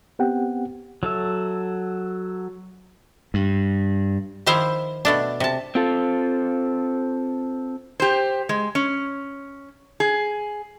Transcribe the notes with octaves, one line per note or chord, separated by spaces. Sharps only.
B3 C4 G4 F#5 G5
F#3 A4 E5
G2
D#3 F3 E4 C5 E5 F5
B2 A3 D4
C3 A5
C4 F4 A4
G4 C5
G#3
C#4
G#4